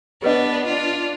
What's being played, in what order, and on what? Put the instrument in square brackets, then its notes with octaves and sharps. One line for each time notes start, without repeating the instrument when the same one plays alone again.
[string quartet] B3 D4 [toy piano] G4 B4 D#5
[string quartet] D4 F4